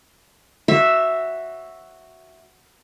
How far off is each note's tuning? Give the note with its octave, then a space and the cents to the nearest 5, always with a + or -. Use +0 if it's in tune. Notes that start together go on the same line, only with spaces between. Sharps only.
F#4 +0 C5 +40 E5 +0